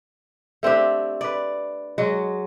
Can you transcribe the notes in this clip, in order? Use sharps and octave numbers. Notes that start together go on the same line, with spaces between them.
A3 C4 D4 G4
B4 D5
F#3 G#3 F#4